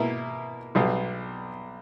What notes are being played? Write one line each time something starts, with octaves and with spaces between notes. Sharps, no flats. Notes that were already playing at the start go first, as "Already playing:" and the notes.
Already playing: B2 A#3 E4
B1 B2 G3 B3